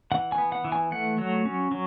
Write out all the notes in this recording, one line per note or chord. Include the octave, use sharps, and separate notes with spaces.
E3 F#5
G#5
B3
F#5
E3
G#5
A3 F#5
F#3
C#4
F#3